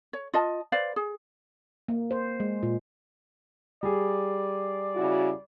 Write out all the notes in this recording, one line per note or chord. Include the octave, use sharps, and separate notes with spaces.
C#5
F4 D#5 A5
B4 C5 D5 F5
G#4
A#3
C5
G#3
A#2
G3 G#4 D5
C#3 E4 F#4